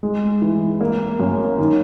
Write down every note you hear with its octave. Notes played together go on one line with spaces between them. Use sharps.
G#3
E3
A#3
F#2
D#3